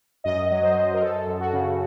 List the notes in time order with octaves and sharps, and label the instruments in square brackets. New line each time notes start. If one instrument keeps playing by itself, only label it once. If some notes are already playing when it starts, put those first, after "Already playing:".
[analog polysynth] F#2 D#5
F#3
C5
F#2
A#4
F#2 A4
F#2
F#4
C#3